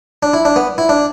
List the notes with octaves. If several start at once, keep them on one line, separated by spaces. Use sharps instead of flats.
D4
E4
D4
B3
E4
D4